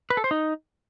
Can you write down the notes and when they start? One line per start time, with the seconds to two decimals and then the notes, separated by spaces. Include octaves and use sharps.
0.10 B4
0.17 A4
0.24 C5
0.31 D#4